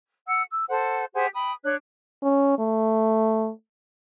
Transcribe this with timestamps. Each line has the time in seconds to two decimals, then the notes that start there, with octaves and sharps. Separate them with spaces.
0.26 F#5 E6
0.51 E6
0.69 A4 C5 F#5
1.13 G4 G#4 C5 F#5
1.33 G5 B5 D#6
1.64 D4 C#5 F#6
2.23 C#4
2.58 A3